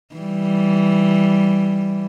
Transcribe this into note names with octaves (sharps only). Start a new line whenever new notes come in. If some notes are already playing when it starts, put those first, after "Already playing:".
E3 G3